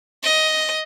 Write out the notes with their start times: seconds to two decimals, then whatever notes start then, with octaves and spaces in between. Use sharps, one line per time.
0.23 D#5